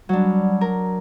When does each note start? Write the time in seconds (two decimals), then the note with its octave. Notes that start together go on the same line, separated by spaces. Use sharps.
0.09 F#3 G3 D4
0.61 A#4